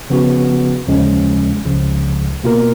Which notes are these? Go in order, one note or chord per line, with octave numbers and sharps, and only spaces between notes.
C#3 F3 B3 F#4
D#2 C#3 F3 G#3 C#4
C#2 C#3 F3
B2 A#3 F4 A#4